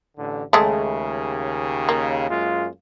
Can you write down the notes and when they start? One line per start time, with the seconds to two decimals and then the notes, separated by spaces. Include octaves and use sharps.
0.18 A1 D3
0.53 D#2 C#3 G#3 A3
1.89 A#3
2.30 F#2 G#3 F4